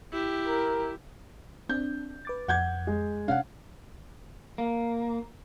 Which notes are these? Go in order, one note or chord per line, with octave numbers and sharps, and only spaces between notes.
E4 G4
A#4
C4 D4 G6
B4 D6 A6
F2 F#5 G6 G#6
G#3
C3 C#4 D4 F5 F#5
A#3